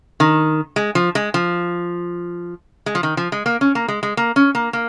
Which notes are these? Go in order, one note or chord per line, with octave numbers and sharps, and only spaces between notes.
D#3
G#3
F3
G#3
F3
G#3
F3
D#3
F3
G#3
A#3
C#4
A#3
G#3
G#3
A#3
C#4
A#3
A#3